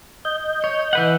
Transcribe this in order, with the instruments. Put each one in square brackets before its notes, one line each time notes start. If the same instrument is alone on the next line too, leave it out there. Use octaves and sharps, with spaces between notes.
[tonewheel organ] D#5 G6
[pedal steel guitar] C#5
E3 B4 F#5